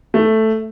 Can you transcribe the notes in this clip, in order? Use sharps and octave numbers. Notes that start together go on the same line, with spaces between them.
A3